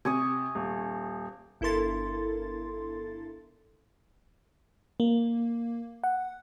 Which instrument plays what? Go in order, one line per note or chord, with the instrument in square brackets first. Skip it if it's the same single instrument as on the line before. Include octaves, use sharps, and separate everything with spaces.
[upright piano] C3 [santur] G#5 C#6 D#6
[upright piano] D#1
[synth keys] G1 E4 A4 A#4 C6 A6
[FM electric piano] A#3
F#5